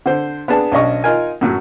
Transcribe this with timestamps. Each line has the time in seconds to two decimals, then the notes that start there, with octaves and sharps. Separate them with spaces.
0.06 D3 C5
0.48 B3 D4 G#4 A5
0.72 B1 C#4 D4 D#5 C#6
1.04 D#4 F4 A#4 G#5
1.41 F#2 A2 F#3